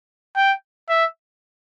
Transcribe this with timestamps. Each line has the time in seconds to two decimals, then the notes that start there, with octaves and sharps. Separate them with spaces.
0.36 G5
0.89 E5